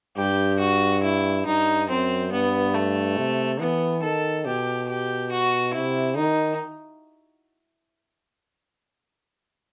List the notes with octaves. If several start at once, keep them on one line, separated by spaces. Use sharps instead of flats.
G2 G4
F#4
E4
G2 D#4
F#2 C4
G2 B3
A3
C3
E3 B3
D#3 A4
B2 G4
G4
F#4
C3 E4
D#3 D#4